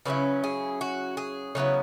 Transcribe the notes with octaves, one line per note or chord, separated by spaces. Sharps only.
C#3 F#3 C#4 E4 B4
G#4
F#4
G#4
C#3 F#3 B3 E4 C#5